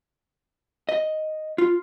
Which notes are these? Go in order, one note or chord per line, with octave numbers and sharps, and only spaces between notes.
D#5
F4